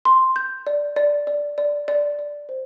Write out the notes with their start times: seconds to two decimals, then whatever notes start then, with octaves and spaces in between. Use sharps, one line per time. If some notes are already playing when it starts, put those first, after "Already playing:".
0.05 C6
0.36 G6
0.67 D5
0.96 D5
1.27 D5
1.58 D5
1.88 D5
2.19 D5
2.49 C5